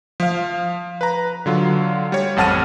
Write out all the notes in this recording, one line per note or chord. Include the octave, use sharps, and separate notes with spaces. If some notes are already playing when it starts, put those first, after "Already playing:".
F3 F5
B4 A#5
D3 F#3 F4
G3 C#5
A1 F2 F#5 A5 F6 D#7